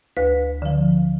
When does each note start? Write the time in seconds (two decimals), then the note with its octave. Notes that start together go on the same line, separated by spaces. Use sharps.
0.17 D2 B4
0.62 D3 F3